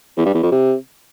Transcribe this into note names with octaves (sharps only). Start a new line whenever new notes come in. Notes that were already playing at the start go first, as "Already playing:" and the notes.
E2
G2
E2
F2
C3